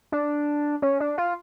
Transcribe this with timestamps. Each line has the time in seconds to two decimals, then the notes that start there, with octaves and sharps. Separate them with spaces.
0.12 D4
0.82 C#4
1.00 D4
1.18 F4